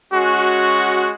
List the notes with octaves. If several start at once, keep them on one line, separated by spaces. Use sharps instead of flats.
G#3 C#4 F#4